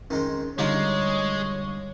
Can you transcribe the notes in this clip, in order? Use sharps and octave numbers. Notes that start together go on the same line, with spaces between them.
D#3 G#3 C4 C#4
D3 G3 G#3 D#4 F4 G4 C#5